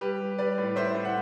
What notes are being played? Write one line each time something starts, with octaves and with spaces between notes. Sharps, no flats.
G3 G4 B4
G3
G3 B4 D5
A2
A2 C5 E5
A2
F#5